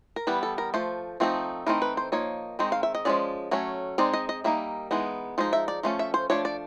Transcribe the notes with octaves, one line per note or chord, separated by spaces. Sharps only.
A#4
E3 G3 B3 B4
A4
A#4
F3 A3 C5
F3 A3 C4 D#4
E3 A3 C4 D#4 A#4
B4
C5
F3 A#3 D#4 C#5
D#3 G#3 C4 D#4
F5
E5
D#5
F3 G#3 C#4 D5
F#3 A3 C#4
G#3 C4 D#4 D5
D#5
D#5
G3 A#3 D#4 E5
E3 G#3 B3 D#4
F3 G#3 D#4
E5
D5
F3 A3 C#4
E5
C5
F3 A3 D4 C#5
D5